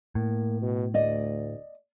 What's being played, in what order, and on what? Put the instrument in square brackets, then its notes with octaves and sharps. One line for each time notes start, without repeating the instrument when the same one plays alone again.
[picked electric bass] A2 [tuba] A#3
[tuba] B2
[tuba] D2 [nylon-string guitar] D5 D#5